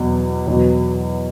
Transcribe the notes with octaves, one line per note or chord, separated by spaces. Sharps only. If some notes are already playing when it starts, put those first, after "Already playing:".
Already playing: E2 B2 F#3
E2 B2 F#3